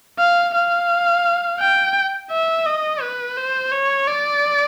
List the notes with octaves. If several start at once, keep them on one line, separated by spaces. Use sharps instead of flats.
F5
F5
G5
E5
D#5
B4
C5
C#5
D5